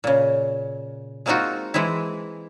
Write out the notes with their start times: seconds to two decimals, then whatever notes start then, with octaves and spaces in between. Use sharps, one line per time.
0.04 A#2 C#3
1.26 G#3 A#3 C4 D#4 F4 F#4
1.74 E3 G#3 C4 E4